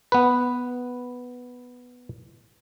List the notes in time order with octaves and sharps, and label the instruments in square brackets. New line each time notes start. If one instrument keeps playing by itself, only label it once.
[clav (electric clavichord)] B3 B4